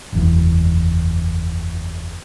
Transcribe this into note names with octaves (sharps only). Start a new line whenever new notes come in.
F#1 E2